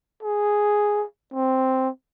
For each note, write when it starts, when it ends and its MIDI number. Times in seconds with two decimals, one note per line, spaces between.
0.23 1.05 68
1.34 1.89 60